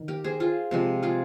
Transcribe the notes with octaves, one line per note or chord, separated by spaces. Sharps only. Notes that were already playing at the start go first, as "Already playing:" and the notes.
Already playing: D#3
G4 A#4
G#4 C5
F4 G#4
C3 F3 G#3
F4 G#4